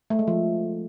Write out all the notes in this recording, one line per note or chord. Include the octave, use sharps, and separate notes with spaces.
A3
G#3
F3